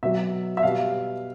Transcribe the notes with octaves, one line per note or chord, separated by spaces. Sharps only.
B2 F#3 E5
E5
B2 G3 F5